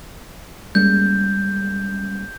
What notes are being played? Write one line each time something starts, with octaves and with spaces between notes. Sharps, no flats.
G3 G#3 A#3 C#4 G6